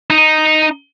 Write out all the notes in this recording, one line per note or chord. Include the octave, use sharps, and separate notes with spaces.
D#4